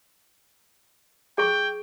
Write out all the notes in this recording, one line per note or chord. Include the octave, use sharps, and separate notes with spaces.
G#4 G5 C#6